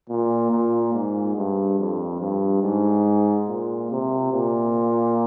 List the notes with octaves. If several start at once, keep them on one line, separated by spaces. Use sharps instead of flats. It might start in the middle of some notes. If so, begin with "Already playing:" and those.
A#2
A#2
G#2
G2
F2
G2
G#2
A#2
C3
A#2